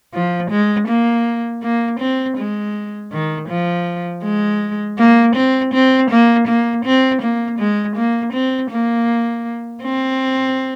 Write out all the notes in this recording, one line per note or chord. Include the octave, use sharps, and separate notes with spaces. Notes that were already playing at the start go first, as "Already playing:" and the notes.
F3
G#3
A#3
A#3
C4
G#3
D#3
F3
G#3
A#3
C4
C4
A#3
A#3
C4
A#3
G#3
A#3
C4
A#3
C4